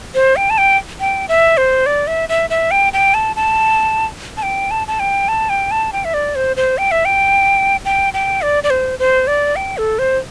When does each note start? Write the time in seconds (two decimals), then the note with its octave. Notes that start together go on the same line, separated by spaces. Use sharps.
0.15 C5
0.36 G5
0.50 A5
0.58 G5
1.00 G5
1.29 E5
1.57 C5
1.86 D5
2.07 E5
2.29 E5
2.50 E5
2.71 G5
2.93 G5
3.14 A5
3.36 A5
4.37 A5
4.43 G5
4.71 A5
4.88 A5
5.00 G5
5.28 A5
5.49 G5
5.71 A5
5.93 G5
6.05 E5
6.14 D5
6.35 C5
6.57 C5
6.78 G5
6.91 E5
7.05 G5
7.85 G5
8.14 G5
8.42 D5
8.64 D5
8.70 C5
8.99 C5
9.27 D5
9.56 G5
9.78 A4
9.99 C5